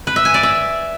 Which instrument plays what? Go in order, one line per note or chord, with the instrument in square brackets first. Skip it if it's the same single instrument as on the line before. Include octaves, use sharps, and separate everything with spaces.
[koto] B4
E5
G#5
D5
E5